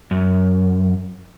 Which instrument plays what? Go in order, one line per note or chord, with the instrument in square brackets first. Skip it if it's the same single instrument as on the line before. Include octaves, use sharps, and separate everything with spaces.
[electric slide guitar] F#2